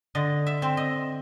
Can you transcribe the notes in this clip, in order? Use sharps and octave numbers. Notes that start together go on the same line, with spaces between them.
D3 D#5
E5
C4
D#5